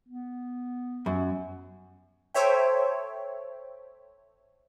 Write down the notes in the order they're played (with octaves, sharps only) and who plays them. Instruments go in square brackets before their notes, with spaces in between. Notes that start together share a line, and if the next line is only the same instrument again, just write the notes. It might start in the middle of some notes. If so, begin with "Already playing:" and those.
[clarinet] B3
[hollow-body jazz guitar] F#2
[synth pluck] A4 C5 C#5 E5 G5